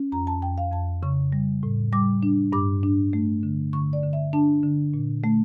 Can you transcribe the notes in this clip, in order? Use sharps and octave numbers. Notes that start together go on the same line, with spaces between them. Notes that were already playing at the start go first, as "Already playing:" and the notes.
Already playing: C#4
F2 A#5
A5
F2 G5
F5
F2 A5
C#3 C#6
G3
A2
G3 D6
D4
G2 D6
D4
A3
D3
D3 C#6
D5
D3
E5
D4 A5
D3
A#2
A3